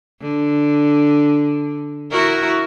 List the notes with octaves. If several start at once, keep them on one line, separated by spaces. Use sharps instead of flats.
D3
E4 F#4 A#4